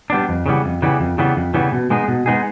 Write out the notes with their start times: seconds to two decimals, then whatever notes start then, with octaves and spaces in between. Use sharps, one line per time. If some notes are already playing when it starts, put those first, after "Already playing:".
0.10 G3 B3 D4
0.29 F2
0.46 C#3 E3 G3 B3
0.65 F2
0.82 C#3 E3 G3 B3
1.00 F2
1.18 C#3 E3 G3 B3
1.36 F2
1.54 C#3 E3 G3 B3
1.72 B2
1.90 G#3 B3 D#4 G#4
2.08 B2
2.26 G#3 B3 D#4 G#4